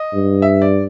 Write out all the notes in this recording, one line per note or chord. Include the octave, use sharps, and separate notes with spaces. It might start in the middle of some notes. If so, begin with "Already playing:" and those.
Already playing: D#5
G2
E5
D5